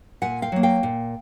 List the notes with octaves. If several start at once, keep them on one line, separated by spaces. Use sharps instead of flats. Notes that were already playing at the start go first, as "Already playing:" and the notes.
A#2 F#5 G#5
F5 G5
F#3 A#3
F5 G5
A#2